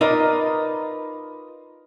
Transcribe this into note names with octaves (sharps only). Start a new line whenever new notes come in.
D#4 F4 A#4 B4 D5 D#5